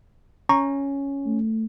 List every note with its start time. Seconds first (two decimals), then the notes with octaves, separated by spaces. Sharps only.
0.49 C#4 A#5 C#6
1.26 A3